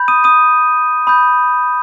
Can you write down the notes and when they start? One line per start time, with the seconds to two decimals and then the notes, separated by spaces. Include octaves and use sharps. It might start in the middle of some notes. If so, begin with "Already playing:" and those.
Already playing: B5 G6
0.08 D#6 D#7
0.24 D#6 D#7
1.07 B5 D#6 G6